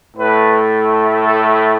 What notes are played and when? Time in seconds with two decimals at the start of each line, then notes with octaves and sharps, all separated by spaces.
0.16 A2 A3 B4
1.25 A4